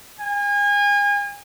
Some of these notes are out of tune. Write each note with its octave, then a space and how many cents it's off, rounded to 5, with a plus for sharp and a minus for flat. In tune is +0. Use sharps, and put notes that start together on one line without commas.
G#5 -35